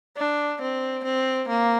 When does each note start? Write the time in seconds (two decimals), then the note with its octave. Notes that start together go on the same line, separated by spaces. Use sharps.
0.17 D4
0.62 C4
1.04 C4
1.49 A#3